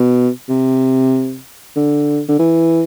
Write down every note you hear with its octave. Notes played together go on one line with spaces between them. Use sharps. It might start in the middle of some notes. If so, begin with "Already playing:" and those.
Already playing: B2
C3
D3
D3
E3